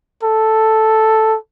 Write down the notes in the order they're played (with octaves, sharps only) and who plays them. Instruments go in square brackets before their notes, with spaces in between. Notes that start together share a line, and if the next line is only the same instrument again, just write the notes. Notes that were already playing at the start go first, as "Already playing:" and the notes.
[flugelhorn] A4